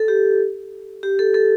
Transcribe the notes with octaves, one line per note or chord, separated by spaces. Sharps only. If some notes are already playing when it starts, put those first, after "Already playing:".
Already playing: A4
G4
G4
A4
A4